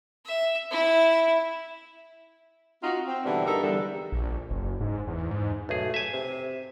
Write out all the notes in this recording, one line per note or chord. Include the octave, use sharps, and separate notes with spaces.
E5
E4
C4 D#4 F4 F#4
C4
B2 D3 E3 G3 D4 E4
G2 D#4 A4 A#4 E5
E2 D3 G3
A#1
F#1
G#2
E2
G#2
B1 A3 G#4
E5 G#5
C3